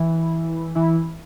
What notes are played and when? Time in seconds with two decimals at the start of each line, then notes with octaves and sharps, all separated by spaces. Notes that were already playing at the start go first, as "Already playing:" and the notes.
Already playing: E3 E4
0.75 E3 E4